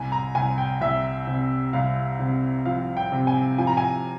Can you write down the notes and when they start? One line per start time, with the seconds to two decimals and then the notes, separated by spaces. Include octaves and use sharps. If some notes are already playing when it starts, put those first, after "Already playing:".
Already playing: C2 G#5
0.12 A#5
0.35 C2 G#5
0.58 G5
0.81 C2 E5
1.27 C3
1.73 C2 F5
2.20 C3
2.65 F3 F5
2.97 G5
3.12 C3
3.27 G#5
3.58 F3 G#5
3.67 A#5
3.77 G#5